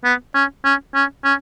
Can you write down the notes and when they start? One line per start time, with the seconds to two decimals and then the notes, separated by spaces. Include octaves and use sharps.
0.04 B3
0.35 C#4
0.65 C#4
0.95 C#4
1.24 C#4